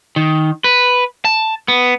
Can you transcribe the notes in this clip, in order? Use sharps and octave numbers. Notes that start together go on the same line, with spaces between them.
D#3
B4
A5
B3